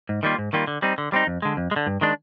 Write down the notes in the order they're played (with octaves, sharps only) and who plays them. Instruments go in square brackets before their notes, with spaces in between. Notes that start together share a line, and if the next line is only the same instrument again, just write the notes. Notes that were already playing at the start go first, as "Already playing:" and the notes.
[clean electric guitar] G#2
D#3 G3 A#3 F4
G#2
D#3 G3 A#3 F4
D3
G3 C4 D#4
D3
G3 C4 D#4
F2
D3 G#3
F2
G#3
D3
G2
D#3 G#3 D4